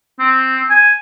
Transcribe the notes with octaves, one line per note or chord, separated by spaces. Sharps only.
C4
G#5